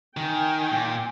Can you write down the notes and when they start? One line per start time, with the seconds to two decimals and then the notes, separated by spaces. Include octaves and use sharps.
0.17 D#3 G5 G#5
0.71 A#2